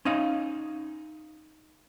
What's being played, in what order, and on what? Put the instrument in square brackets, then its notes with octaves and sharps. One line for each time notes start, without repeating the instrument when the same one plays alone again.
[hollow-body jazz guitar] C#4 D#4 D#5 F5